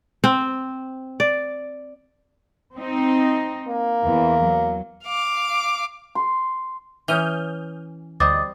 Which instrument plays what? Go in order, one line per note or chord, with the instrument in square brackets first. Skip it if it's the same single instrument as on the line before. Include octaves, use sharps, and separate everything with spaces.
[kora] C4
D5
[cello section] C4 D#4
[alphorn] A#3
[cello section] E2 E3
F#3
[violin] F5 D6
[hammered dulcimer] C6
[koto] E3 C#4 [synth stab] D#6 F6 G6
[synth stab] D2 D#5 [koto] G3 C4 [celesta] D6 D#6 A6